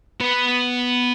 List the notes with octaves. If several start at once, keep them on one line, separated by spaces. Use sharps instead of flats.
B3